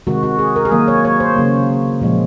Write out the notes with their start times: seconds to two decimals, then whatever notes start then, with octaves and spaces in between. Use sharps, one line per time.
0.07 C3 D#3 G#3 F#4
0.23 F#4
0.39 G#4
0.56 A#4
0.65 G#4
0.71 D#3 F#3 A#3 A#4
0.88 C#5
1.05 C#5
1.20 C5
1.37 C#3 F#3 A#3
2.01 A#2 F3 G#3